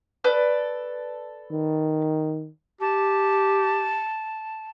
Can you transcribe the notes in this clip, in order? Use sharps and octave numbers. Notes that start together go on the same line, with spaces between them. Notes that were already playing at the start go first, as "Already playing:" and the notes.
A4 B4 D5
D#3
G4 A5